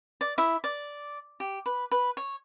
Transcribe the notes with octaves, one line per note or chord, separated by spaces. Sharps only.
D5
E4 E5
D5
G4
B4
B4
C#5